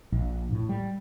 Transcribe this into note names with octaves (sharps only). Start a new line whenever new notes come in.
A#1
A2
G3